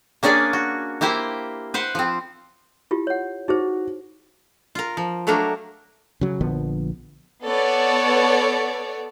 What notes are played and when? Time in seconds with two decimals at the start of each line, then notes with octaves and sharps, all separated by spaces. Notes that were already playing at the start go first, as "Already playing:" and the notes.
0.23 A#3 C#4 D4 G#4 D5
0.53 F#4
1.01 A#3 E4 G4 C5 G5
1.74 B4 C5 F#5
1.95 F3 C4
2.91 E4 F4 G4
3.07 C#5 F#5
3.48 D#4 F#4 G#4 C5
4.75 F4 A#4
4.97 F3
5.27 F#3 A3 A#3 D4 A#4
6.21 C#3 F#3
6.41 A#1 D3 F3 B3
7.45 B3 A4 C#5 D5